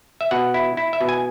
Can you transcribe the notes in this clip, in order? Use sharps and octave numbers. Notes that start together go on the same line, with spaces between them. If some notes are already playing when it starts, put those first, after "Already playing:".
E5
B2 F#5
E4
E4
E5
B2
G#5